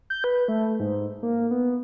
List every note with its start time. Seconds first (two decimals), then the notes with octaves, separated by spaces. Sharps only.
0.10 G6
0.24 B4
0.48 A3
0.80 G#2
1.23 A#3
1.51 B3